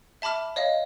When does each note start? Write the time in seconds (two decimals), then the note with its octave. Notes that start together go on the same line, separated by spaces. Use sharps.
0.22 E5 A5 B5 D6 F6
0.56 C#5 D#5 F5